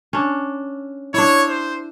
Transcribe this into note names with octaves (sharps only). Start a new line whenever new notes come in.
C#4 D4
D4 E4 C#5
C5